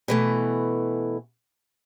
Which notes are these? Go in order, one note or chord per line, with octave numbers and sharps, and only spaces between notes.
B2 E3 A3